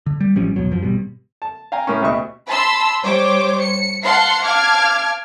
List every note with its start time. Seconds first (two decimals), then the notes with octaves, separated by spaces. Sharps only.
0.06 D3
0.21 G3
0.36 A1 F3 G3 C#4
0.56 A#1 E2 B2 F#3
0.70 F#2 F3 F#3
0.82 G#1 B2 G3
1.42 A5
1.72 F5 G5 G#5 A#5
1.87 A2 A#3 C#4
2.02 D2 B2 G4 E5 C#6
2.47 A5 B5 C6 E6
3.03 G3 C5 C#5 D6
3.61 C#7
4.03 F5 F#5 A5 C6 C7 C#7
4.44 F5 A5 D6 F6 G#6